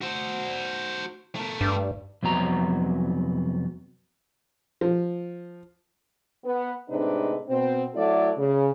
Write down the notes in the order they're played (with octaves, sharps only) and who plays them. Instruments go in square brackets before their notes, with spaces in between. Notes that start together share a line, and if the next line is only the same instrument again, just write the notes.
[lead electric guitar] F#4 C5
A3 A#4
[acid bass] G2
[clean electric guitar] C2 F2 C3 F#3 B3 A#5
[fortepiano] F3
[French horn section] B3
A2 C3 G#3 D4 D#4 B4
B2 C4
F#3 A3 E4 A4 D5
C#3